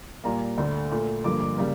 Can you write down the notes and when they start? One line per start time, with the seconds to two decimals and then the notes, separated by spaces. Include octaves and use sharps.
0.24 A#2 G3 A#3 A#5
0.58 D2 D3 A3
0.91 A#2 A3
1.24 G2 D3 F3 A#3 D6
1.40 D6
1.57 C#3 G3 A#3